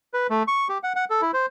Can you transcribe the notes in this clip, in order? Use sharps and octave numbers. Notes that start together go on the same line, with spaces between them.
B4
A3
C#6
G4
F#5
F#5
A4
E4
C5